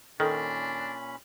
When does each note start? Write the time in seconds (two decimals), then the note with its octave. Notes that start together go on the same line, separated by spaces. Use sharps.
0.20 A#2 D#3 C#4 D4 A4 B5